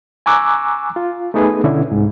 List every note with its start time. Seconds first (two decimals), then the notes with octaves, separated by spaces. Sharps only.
0.26 G#5 A#5 C#6 D6 E6 F#6
0.96 F4
1.34 A3 B3 D#4 G#4 B4
1.64 B2 D3 C#4 D4 E4
1.92 C2 G#2